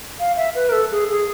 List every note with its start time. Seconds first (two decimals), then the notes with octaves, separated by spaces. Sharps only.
0.20 F5
0.37 E5
0.55 B4
0.69 A#4
0.73 A4
0.92 G#4
1.09 G#4